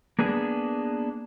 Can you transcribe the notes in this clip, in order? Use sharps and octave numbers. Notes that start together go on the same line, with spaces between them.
A#3 B3 D4 G#4